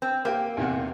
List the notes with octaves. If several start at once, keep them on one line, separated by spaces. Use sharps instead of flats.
C4
A#3 G4 G5
E2 C3 F#5